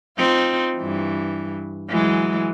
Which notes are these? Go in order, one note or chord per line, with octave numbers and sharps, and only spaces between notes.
C4 D#4 F4
G2 E3
E3 F#3 G#3